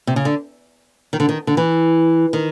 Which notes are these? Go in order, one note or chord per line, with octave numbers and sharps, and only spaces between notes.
C3
C#3
D3
D#3
D3
D#3
D3
E3
D#3